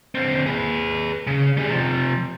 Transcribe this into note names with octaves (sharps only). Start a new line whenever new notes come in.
D3 C4
G#4 B4
C#3
G3 G#4
C3 F3